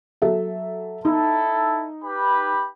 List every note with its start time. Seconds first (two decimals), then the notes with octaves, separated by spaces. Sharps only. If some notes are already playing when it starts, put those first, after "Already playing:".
0.22 F#3 A4 E5
1.05 D#4 E4 A4
2.04 G4 B4 B5